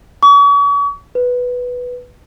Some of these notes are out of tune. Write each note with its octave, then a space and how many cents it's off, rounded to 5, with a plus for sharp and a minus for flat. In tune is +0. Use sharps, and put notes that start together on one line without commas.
C#6 +40
B4 +0